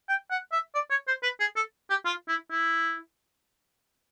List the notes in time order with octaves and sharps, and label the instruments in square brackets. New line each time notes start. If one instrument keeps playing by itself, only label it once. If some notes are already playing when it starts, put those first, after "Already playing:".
[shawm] G5
F#5
E5
D5
C#5
C5
B4
G#4
A4
G4
F4
E4
E4